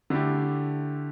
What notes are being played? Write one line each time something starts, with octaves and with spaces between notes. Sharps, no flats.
D3 A3 E4 G4